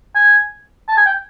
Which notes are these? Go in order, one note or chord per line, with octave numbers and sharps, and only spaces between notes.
G#5
A5
G#5
G5